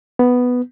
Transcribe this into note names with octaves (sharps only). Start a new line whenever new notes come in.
B3